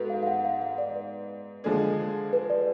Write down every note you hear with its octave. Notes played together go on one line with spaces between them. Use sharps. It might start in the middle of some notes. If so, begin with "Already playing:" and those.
Already playing: G#2 B3 F#4 A4 B4
F5
F5
F#5
F5
F5
D5
B4
D3 F3 G#3 D4 G#4 A4
B4
D5